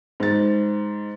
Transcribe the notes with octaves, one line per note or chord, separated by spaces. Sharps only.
G#2 A6